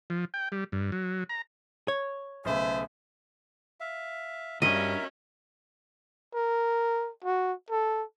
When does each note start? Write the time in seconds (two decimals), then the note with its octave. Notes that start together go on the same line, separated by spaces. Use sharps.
0.10 F3
0.34 G5
0.52 G3
0.72 G2
0.92 F#3
1.29 A#5
1.88 C#5
2.45 B1 C#3 A3 G#4 B4 C5 E5
3.80 E5 F5
4.62 C2 G2 C#4 F#4 A#4 D#5 E5
6.35 A#4
7.25 F#4
7.70 A4